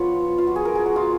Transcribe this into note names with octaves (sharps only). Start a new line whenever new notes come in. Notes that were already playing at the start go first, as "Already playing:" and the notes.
Already playing: F3 B3 F4 B4 C#5
F4
F#4
G#4
A#4
G#4
F#4
F4